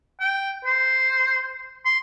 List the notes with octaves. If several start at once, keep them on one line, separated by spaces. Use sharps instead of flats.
G5
C5
C6